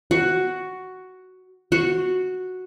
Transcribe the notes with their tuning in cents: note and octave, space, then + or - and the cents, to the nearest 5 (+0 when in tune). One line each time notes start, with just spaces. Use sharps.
F#4 +5
F#4 -5